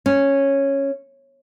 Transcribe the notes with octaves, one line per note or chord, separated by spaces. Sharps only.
C#4